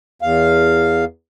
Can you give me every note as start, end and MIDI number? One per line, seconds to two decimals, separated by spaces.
0.22 1.05 40
0.22 1.05 77